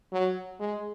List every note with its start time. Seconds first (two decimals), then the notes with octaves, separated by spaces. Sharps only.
0.13 F#3
0.60 G#3